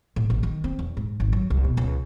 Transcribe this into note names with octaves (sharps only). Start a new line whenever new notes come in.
A2
A1
D#3
C4
E2
G#2
G#1
F#2
C2
B2
C#2